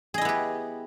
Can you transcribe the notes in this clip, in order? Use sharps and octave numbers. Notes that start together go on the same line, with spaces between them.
B3 E4 G4 G#4 D#5